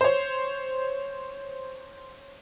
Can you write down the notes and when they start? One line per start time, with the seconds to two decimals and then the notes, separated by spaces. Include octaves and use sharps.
0.01 C5 C#5